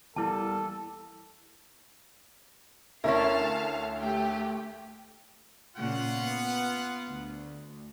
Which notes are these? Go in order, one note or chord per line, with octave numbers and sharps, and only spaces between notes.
E2 G3 A#3 E4 A4 A5
D2 C#4 E4 A#4 F5 A5
A3 G4
A#2 C#3 A#3 F4 F#5
B3
D2